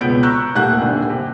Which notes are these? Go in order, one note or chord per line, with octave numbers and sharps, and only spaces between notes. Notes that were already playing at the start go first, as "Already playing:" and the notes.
E1 C#2 B3 G6 D7
A#5 C#6 E6 F#6 G6
D#1 A3 A#3 G4 F#5 F#6
D#1 D3
C3